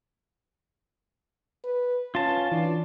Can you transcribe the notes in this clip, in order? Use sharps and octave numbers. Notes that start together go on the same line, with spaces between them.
B4
C#4 F4 A5
E3 D4